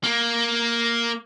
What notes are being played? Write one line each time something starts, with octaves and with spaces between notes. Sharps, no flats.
A#3